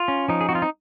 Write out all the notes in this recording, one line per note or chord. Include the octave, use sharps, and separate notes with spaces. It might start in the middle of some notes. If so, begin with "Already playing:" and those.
Already playing: F4
C#4
F3 D#4
G#4
C4 F#4
F4
D#4